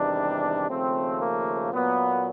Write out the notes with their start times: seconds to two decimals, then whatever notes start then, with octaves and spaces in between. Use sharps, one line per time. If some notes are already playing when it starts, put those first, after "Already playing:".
Already playing: E2 C3 D#3 G3 D4
0.69 D#2 C#3 F3 A3 C4
1.21 A#3
1.72 A#2 F#3 A#3 B3